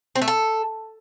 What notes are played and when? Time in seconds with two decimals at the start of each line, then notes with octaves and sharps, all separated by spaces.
0.15 C4
0.22 A3
0.28 A4